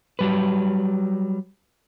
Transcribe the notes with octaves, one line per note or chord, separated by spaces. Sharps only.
F#3 G3 B4